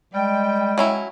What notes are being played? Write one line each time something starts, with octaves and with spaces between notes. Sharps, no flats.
G3 G#3 G5
F#3 C#4 E4